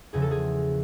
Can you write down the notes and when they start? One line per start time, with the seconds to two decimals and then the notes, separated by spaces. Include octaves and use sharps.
0.13 E2 C#3 F3 G#4
0.22 A4
0.31 G#4